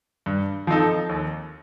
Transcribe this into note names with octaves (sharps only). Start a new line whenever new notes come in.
G2
F3 C4 D#4 A4
D#2